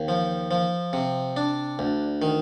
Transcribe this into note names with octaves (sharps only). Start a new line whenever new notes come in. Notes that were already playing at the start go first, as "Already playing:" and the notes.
Already playing: D#2
F3
F3
C3
D4
D2
D#3